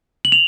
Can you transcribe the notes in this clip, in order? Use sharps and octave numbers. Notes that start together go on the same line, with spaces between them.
F#7
F7